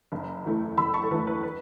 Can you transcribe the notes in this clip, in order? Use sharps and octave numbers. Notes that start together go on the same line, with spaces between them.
F#1
E2 E3 A3 E4
F#1 B5 E6
A5 C#6
A4
E2 E3 A3 E4 B4
B4
B4